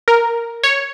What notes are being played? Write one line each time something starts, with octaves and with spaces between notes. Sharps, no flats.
A#4
C#5